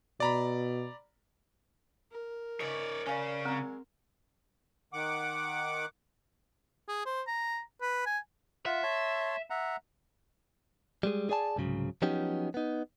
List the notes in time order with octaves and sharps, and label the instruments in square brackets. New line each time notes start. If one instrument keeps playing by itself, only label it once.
[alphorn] B2 [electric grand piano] D5 A#5 B5
[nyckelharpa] A#4
[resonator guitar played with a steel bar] C#3 D#4 B4 [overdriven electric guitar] C#5 D5
[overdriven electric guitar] C#3 C#4 [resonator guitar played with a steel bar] D5 F5 G#5
[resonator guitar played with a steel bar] F#3 G#3 [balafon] C4 A#5
[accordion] D#3 F#5 D6
[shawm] G#4
C5
A#5
B4
G#5
[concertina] F4 F#5 [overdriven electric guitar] E5
[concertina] C#5 A5 C6
E5 F#5 A#5
[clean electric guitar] G3 G#3 G#4
G#4 D5 G#5 A5
C2 G#2 C#3 F#3
F3 F#3 B3 C#4 D#4 G4
B3 D#4